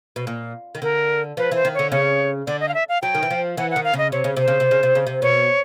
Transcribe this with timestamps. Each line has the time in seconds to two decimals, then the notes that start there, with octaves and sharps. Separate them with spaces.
0.16 B2
0.27 A#2
0.75 D#3
0.82 D3 A#4
1.37 F3 B4
1.52 E3 C5
1.65 D#3
1.75 D3 C#5
1.92 C#3 C#5
2.47 D3 D5
2.60 D#5
2.68 F5
2.74 E5
2.89 F5
3.02 F#3 G5
3.15 D#3
3.23 E3
3.30 F3
3.57 E3 F#5
3.71 F#5
3.76 D#3
3.84 F5
3.94 C#3 D#5
4.12 C3 C#5
4.24 C#3
4.37 C3 C5
4.48 C#3
4.60 C3
4.71 C#3
4.83 C3
4.95 C#3
5.07 C3
5.22 B2 C#5